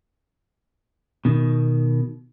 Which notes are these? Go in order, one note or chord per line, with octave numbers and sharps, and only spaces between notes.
B2 D#3